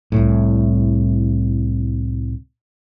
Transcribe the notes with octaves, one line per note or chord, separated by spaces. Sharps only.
C2 A2